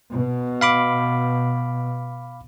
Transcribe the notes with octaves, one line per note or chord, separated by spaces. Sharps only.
B2
F5 B5 D6